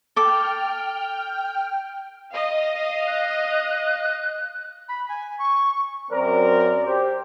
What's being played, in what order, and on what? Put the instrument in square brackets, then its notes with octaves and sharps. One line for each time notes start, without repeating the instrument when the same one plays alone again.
[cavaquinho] A4 D6 [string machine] G5 F6
[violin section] D#5 F5
[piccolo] F#6
[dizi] B5
G#5
C#6
[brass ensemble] F#2 C4 A#4 [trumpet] D5
[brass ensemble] G4 [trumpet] C5